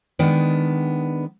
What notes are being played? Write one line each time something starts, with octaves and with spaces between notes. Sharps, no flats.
D#3 G#3 B3 D4